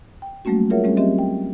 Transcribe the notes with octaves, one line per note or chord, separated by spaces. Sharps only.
G5
F#3 G3 A3 A#3 C#4 F#4
F4 G#4 A#4 C#5 E5 F#5
G3 A3 C4 C#4 G#4
F#3 C4 C#4 G4 D#5 E5
G5